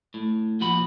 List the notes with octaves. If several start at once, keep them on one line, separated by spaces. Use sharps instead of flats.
A2
A#2 F3 F#4 B5